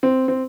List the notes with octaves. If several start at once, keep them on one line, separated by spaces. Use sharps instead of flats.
C4
C4